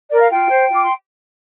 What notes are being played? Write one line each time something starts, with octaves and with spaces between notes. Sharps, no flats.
A#4 D5
F5
F4 G5
C5
F4
D6
C6